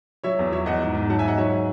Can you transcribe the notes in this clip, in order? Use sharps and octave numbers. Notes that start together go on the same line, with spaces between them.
F#3 C#5 E5
E2
F#3 C#5 E5
E2 D#5 F#5
G#2
G#2
F#3 F#5 A5
E5 G#5
G#2 D#5 F#5
F#3 C#5 E5